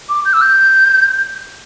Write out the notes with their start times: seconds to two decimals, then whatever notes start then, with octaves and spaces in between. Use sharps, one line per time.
0.09 D6
0.25 G6
0.33 E6
0.41 G6